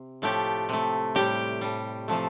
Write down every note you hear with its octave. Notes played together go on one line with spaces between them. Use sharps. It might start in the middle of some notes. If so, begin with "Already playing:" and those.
Already playing: C3
A2 F3 A3 G4
C3 A3
A2 G3 G4
A2 G3
C3 F3 A3